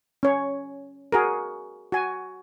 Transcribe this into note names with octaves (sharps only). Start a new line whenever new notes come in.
C#4 C#5
F#4 G#4 A#4
F#4 G#5